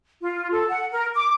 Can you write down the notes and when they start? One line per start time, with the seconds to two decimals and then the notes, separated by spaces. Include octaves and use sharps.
0.22 F4
0.51 A4
0.69 F#5
0.92 A#4
1.14 D6